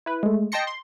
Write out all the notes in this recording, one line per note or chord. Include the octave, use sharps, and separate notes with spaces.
E4 B4
G#3 A3
D#5 G5 A5 C6 A#6 C#7
C6